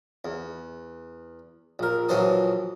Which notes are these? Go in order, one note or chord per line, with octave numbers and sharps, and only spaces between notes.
E2
A#1 A#4
A#1 E3 F#3 C5 A5 D#6